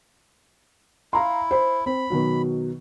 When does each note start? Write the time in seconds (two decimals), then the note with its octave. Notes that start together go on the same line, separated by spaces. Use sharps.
1.13 E4 F5 A#5 C6
1.51 C5 B5
1.86 C4 B5
2.10 B2 D#3 F#3